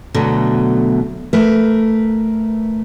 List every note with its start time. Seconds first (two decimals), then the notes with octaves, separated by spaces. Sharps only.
0.14 B2 D3 F#3 A3
1.33 A3 A#4 B4